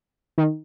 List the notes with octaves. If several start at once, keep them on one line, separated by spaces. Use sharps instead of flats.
D#3